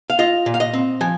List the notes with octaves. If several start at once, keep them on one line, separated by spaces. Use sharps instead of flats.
F5
F4 D#5
A#2
F5
D#5
C4
F3 G#5